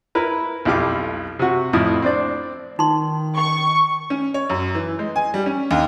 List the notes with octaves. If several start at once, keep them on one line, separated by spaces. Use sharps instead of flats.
E4 A#4 B4
B1 F2 E4 G4 F5 D6
C3 F#4
F2 A2 F3 E4 D#6
C4 D4 D5
D#3 D#4 C6
C#6
C#4
C#5
F#2
E3
G#3
G#5
G3
C#4
D#2